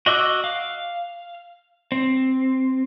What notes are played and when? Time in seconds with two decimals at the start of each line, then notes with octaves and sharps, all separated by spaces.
0.06 F#4 D#5 D6 E6 F#6
0.44 F5
1.92 C4